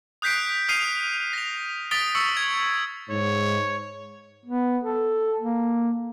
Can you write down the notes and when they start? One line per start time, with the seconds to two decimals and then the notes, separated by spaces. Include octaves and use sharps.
0.22 D#6 F#6 G6 B6 C7 D7
0.69 D#6 F6 C7 D#7 F7
1.33 A#6 F7
1.91 D#6 A6 B6 D7 G7
2.15 C#6 E6 C#7
2.37 G#6
3.10 G#2 C#5
4.45 B3
4.84 A4
5.40 A#3